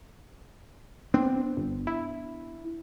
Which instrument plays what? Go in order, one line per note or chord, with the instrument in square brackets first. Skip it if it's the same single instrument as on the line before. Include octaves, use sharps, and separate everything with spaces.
[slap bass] B3 D4 [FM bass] C4
[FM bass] G1
E4